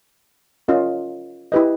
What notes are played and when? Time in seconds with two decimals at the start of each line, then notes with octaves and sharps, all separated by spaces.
0.68 C#4 F4 A#4 D#5
1.52 E4 G4 B4 D#5